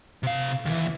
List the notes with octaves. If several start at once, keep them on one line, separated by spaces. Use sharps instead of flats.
C3 F5
D#2 E3